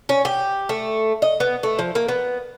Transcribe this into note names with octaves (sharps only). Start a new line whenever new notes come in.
C#4
G4
A3
D#5
B3
A3
F3
A#3
B3